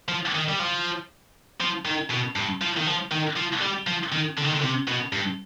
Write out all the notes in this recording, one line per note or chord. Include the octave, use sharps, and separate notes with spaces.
F3
D#3
G3
F3
F3
D#3
B2
G2
F3
D#3
F3
D#3
F3
G3
F3
D#3
D3
D#3
D3
C3
B2
G2